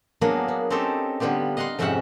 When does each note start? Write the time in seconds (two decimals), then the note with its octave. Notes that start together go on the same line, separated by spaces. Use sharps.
0.21 F#3 A#3 B3 D4 G#4
0.48 B3
0.70 C4 C#4 D#4 G4 A4 C5
1.20 D3 G3 B3 F4 G4
1.57 D#5 F5 F#5 A#5 C6
1.79 F2 G#2 C3 C#4 E5 F#5